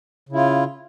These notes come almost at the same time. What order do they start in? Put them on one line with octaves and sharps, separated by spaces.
C#3 E4 F4